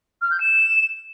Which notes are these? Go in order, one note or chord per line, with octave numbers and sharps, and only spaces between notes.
F6
G6
E7